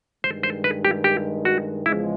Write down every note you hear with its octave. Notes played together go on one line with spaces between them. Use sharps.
G2 D#3 G#3 C5
C5
B4
G4
G4
F#4
E2 C#3 F3 G#3 E4